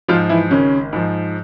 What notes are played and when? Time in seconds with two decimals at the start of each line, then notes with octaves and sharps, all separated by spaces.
0.08 G#2 F3 F4
0.29 E3 E4
0.51 G#1 C#3 C#4
0.93 G#2 F3